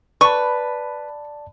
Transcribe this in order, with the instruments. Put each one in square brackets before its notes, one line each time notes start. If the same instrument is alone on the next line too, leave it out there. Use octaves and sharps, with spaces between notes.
[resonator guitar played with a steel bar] B4 [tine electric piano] D5 A5 [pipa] C#6